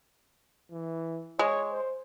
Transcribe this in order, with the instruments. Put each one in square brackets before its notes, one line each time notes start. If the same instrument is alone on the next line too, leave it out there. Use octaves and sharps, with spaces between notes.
[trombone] E3
[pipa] G#3 [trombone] C#5
[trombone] C5